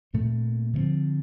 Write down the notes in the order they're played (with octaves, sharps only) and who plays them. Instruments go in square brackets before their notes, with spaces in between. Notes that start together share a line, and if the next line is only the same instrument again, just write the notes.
[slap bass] A#2 A3 C4
D3 F3 A3 C4